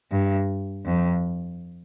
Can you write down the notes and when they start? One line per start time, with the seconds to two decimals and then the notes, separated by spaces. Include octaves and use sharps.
0.11 G2
0.85 F2